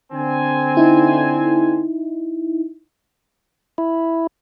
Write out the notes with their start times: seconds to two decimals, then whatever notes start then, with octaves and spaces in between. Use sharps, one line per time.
0.12 D3 C4 G#5
0.77 D#4 E4
3.78 E4